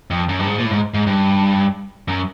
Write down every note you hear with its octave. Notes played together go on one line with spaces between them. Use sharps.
F2
F#2
G2
G#2
A#2
A2
G#2
G#2
G2
F#2